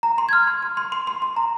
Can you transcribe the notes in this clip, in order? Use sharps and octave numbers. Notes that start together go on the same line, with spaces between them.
A#5
C6
G#6
F6
C6
C6
C6
C6
C6
C6
A#5